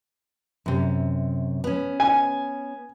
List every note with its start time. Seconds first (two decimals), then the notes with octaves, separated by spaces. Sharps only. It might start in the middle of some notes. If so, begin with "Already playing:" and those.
0.66 F#2 C3
1.64 B3 C#4
2.00 G#5